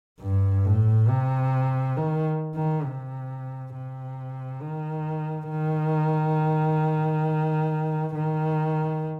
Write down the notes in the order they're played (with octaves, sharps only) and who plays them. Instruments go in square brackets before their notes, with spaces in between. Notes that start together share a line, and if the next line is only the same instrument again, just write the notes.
[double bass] G2
A2
C3
D#3
D#3
C3
C3
D#3
D#3
D#3